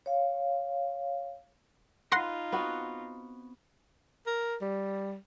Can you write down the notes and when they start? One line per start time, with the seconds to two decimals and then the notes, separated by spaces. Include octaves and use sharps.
0.06 C#5 F5
2.12 D#4 F4 B4 F#5 C6 A#6
2.52 B3 C4 F#4
4.27 A#4
4.61 G3